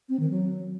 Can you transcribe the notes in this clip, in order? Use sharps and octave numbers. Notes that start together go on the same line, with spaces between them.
C4
D#3
F#3